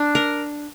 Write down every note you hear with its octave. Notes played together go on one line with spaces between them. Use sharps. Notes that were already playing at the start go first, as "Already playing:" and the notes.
Already playing: D4
A#4